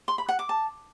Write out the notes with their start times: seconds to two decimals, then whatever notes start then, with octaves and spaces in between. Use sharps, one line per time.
0.08 C6
0.18 B5
0.29 F#5
0.39 D6
0.49 A5